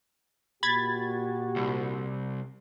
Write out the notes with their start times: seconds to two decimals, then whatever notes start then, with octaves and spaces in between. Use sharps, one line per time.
0.63 A#2 F#4 G4 B5 G#6 A6
1.56 C2